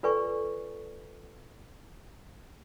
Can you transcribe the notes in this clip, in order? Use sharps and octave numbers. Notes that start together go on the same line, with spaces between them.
F4 A4 B4 D5 G#5 C#6